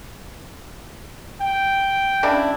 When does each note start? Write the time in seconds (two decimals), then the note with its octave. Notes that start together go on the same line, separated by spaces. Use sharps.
1.42 G5
2.23 C#3 D4 E4